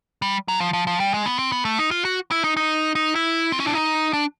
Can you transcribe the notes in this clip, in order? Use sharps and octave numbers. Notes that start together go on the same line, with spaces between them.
G3
F#3
F3
F3
F3
G3
G#3
B3
C4
B3
A3
D#4
F4
F#4
E4
D#4
D#4
D#4
E4
C4
C#4
D4
D#4
D4